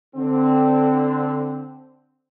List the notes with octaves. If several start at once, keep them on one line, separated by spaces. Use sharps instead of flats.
D3 C4